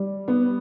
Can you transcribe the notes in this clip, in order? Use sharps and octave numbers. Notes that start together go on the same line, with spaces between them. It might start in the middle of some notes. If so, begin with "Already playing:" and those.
Already playing: G3
B3